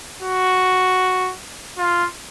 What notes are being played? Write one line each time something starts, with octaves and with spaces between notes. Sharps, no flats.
F#4
F4